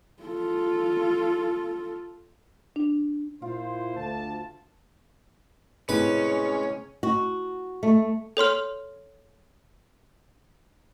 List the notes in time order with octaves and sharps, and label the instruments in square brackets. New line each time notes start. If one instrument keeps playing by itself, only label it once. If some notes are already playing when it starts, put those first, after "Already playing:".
[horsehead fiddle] F4 A4
[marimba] D4
[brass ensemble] A#2 E4 C5 [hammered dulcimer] F4
[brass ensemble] D2 A5
[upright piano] A2 C3 [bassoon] G#3 [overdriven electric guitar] C#4 [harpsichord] B4
[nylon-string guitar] F#4
A3
[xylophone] A4 C#5 C6 F6